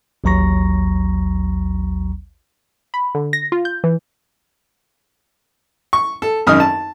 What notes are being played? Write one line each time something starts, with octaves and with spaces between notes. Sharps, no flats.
A1 D#2 F#3 A#5 C#6 A#6
B5
D3
A#6
F4
G6
E3
C#6
A4
G#1 F#2 D#4 D#6 F6
A5